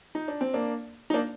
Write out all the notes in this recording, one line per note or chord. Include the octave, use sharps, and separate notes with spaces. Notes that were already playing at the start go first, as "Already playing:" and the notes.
D#4
D4
C4
A#3 D4
D#4
A#3 D4